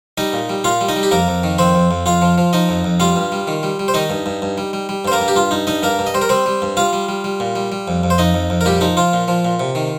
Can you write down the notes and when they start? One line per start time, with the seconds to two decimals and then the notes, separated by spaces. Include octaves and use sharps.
0.18 G3 D#4 D#5
0.33 A#2
0.49 G3
0.64 A#2 F4 F5
0.81 G3
0.89 D#4 D#5
0.96 G3
1.03 G4
1.11 F2 A#3 A#4
1.28 F2
1.43 D#3
1.58 F2 C4 C5
1.75 F2
1.91 F2
2.06 F2 F4 F5
2.22 F3
2.38 F3
2.53 F3 D#4 D#5
2.69 F2
2.84 F2
3.00 G3 F4 F5
3.16 G2
3.32 G3
3.47 D#3
3.63 G3
3.79 G3
3.88 C5
3.94 D#3 D#4 D#5
4.10 G2
4.26 G2
4.42 G2
4.58 G3
4.73 G3
4.89 G3
5.05 G2 C5
5.12 A#3 A#4
5.20 G2
5.28 G4
5.36 G2 F4
5.51 G2 D#4
5.67 G2 D#4 D#5
5.83 G2 A#3 A#4
5.99 G2
6.07 D#5
6.14 G3 C5
6.22 A#4
6.29 G3 C4 C5
6.46 G3
6.62 G2
6.77 G3 F4 F5
6.93 G3
7.09 G3
7.24 G3
7.40 A#2
7.56 G3
7.72 G3
7.88 F2
8.04 F2
8.10 C5
8.18 F2 D#4 D#5
8.34 F2
8.50 F2
8.61 A#4
8.65 A#2 G3 G4
8.81 F3 D#4
8.97 F3 F4
9.13 A#2
9.28 F3
9.45 A#2
9.60 C3
9.75 D#3